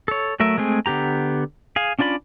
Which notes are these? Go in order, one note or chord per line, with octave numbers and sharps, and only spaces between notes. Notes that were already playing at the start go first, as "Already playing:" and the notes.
A4 C#5
F#3 A3 A#4 E5
G#3 A3 C4 G#4
D3 B3 G4 A#5
G#4 F5
C#4 D4 F4 D5 B5